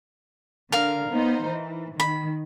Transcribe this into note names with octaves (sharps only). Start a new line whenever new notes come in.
D3 A#4 F5
B3 D#4 C5
E3
D#3 B5